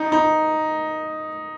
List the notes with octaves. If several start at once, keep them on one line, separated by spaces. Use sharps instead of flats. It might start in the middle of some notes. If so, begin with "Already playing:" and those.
Already playing: D#4
D#4